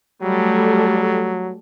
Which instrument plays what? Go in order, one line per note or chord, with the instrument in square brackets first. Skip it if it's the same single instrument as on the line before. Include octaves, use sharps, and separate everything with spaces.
[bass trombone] F#3 [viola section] G3 A3 A4